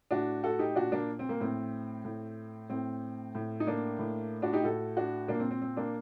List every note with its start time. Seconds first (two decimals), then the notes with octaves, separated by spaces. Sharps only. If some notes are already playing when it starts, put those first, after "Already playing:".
0.11 A2 D4 F#4
0.44 F#4 A4
0.59 D#4 G4
0.75 A#2 D4 F#4
0.92 A#3 D4
1.19 C4
1.29 A#3
1.40 A2 C4
2.05 A2
2.70 A2 C4
3.35 A2
3.60 D#4
3.67 A#3 D4
3.99 A2
4.42 D4 F#4
4.53 D#4 G4
4.64 A2 F#4 A4
4.97 D4 F#4
5.28 A#2 A#3 D4
5.40 C4
5.51 C4
5.62 C4
5.77 A#3 D4